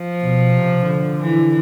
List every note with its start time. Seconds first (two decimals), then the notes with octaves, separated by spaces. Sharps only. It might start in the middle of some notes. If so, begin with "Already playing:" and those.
Already playing: F3
0.21 B2
0.54 C3
0.88 D3
1.20 E3